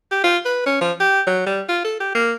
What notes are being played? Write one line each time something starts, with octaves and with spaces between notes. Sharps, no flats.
G4
F4
B4
C#4
F3
G4
F#3
G3
F4
A4
G4
A#3